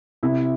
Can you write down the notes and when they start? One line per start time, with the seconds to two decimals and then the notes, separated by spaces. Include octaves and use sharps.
0.23 C3 E4